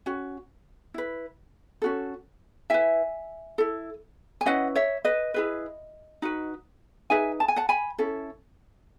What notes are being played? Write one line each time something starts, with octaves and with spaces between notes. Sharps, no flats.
C#4 F#4
E4 B4
C#4 F#4 A4
E4 B4 E5 G#5
E4 A4
G#5
C#4 E4 B4 D#5 F#5
C#5 E5
B4 D#5
E4 G#4 B4
D#4 F#4 B4
D#4 G#4 B4 E5 G#5
A5
G#5
F#5 A5
G#5 B5
C#4 E4 A4